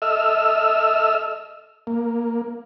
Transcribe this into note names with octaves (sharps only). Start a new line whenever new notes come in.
A4 D#5 E5 E6 F6
A#3